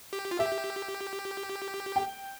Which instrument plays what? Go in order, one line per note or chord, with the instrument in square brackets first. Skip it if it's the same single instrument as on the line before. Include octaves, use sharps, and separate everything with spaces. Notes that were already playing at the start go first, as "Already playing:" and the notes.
[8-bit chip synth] G4
F4
[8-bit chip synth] G4 [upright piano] E5
[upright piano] G5